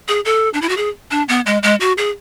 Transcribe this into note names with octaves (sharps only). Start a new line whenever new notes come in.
G#4
A4
D4
E4
F#4
G#4
D4
B3
G#3
G#3
F#4
G#4